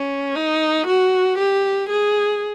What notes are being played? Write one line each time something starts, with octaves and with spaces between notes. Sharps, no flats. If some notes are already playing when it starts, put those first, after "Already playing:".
Already playing: C#4
D#4
F#4
G4
G#4